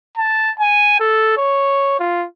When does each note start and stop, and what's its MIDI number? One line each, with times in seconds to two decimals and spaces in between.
0.17 0.52 81
0.60 0.96 80
1.00 1.35 69
1.37 1.97 73
1.99 2.26 65